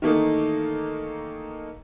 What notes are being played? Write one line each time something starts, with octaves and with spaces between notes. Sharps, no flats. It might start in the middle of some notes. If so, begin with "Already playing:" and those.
D#3 E3 A3 A#3 D#4